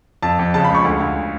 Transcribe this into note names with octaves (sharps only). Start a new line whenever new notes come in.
F2 A5
F2
C#3 A5
B5
C#2 C#6
D2
D2